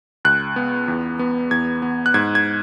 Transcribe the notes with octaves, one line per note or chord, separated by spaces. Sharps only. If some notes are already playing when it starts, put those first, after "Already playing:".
C#2 F#6
B3
E2
B3
E2 G#6
B3
F#6
G#2 G#6
G#6